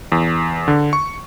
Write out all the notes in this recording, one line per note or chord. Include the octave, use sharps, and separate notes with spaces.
E2
D3
C#6